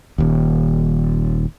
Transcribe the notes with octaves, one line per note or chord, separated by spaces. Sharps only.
D#1 D#2